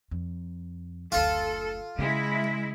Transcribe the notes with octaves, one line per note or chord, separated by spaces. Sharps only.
F2
F#1 D2 F4 A4
C#3 G#3 E4